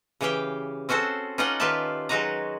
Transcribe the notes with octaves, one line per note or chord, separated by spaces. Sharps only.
C#3 E3 G4 F5 G5
C4 C#4 F#4 A4 C5
C#4 D#4 F4 D5 D#5 F#5
D#3 F4 G4 B4 E5 A5
F#3 G#3 D#4 F#4 B4 A#5